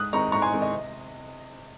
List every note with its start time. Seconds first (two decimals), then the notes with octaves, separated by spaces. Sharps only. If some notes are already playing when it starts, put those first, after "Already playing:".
Already playing: G#2 D#6 F#6
0.13 D#3 G#3 C4 D#4 A#5 C#6
0.32 G#2 A#5 C#6
0.42 G#5 C6
0.52 D#3 G#3 C4 D#4
0.62 D#5
0.71 C3